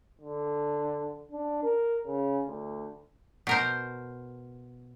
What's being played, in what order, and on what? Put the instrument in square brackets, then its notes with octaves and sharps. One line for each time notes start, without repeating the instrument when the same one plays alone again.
[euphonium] D3
D4
A#4
C#3
D2
[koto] B2 A#4 C5